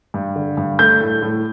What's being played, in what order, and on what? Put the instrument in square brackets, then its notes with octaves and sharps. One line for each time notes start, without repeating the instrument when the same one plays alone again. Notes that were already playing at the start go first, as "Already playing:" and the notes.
[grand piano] G2
D3
G2
A3 G6
A2
A2